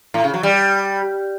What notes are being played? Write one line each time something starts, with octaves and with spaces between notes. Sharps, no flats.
A2
C#3
F#3
G3